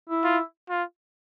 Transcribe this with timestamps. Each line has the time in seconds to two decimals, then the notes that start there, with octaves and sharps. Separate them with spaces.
0.09 E4
0.24 F4
0.70 F4